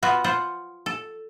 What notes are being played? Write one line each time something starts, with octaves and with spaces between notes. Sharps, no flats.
B3 F4 F#4
F4 C5 F#5
A4